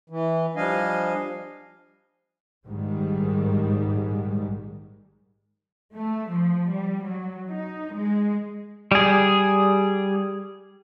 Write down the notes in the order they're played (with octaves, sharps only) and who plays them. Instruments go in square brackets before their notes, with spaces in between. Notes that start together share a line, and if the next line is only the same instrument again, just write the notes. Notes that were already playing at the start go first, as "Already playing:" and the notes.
[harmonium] E3
F3 G3 D4 D#5 F5 G#5
[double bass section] A#1 G#2 D#3 G3 G#3
[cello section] A3
F3
G3
F#3
D#4
G#3
[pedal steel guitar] G3 G#4